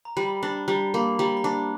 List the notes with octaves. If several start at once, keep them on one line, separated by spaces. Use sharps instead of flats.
A#5
G3 B5
D4
G3 A#5
A#3 B5
G3 A#5
A#5
D4